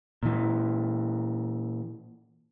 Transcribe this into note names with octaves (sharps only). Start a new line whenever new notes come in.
A#2 E3